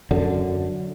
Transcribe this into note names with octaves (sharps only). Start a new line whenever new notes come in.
F#2 D3